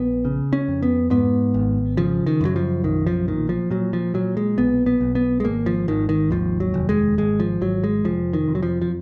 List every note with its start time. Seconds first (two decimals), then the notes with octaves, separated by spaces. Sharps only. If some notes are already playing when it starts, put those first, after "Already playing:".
Already playing: A#1 B3
0.25 C#3
0.53 C#4
0.68 F2
0.83 B3
1.10 G#2 B3
1.54 G#1
1.97 C#3 F3
2.26 D#3
2.41 F#2 F#3
2.56 F3
2.84 B1 D#3
3.07 F3
3.28 A#2 D#3
3.49 F3
3.71 A#2 F#3
3.93 F3
4.14 A#2 F#3
4.37 G#3
4.58 B1 B3
4.86 B3
5.01 B1
5.15 B3
5.40 G#3
5.44 G#1 A#3
5.66 F3
5.88 G#1 D#3
6.09 D#3
6.31 D#2 F3
6.60 F#3
6.74 F1
6.89 G#3
7.18 G#1 G#3
7.40 F3
7.61 G#1 F#3
7.84 G#3
8.05 F1 F3
8.33 D#3
8.48 F2
8.55 F#3
8.63 F3
8.82 F3